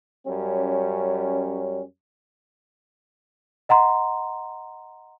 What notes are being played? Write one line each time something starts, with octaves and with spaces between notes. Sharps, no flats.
F#2 G3 C#4
D#5 F#5 A#5 C6